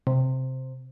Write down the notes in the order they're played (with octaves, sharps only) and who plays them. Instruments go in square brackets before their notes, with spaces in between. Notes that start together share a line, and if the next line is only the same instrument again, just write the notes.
[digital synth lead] C3